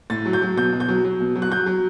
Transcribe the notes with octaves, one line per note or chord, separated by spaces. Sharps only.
A2 A6
F#3
G6
F#3
B2 G6
B2
G6
F#3
F#3
B2
F#3
F#6
F#3 G6
F#3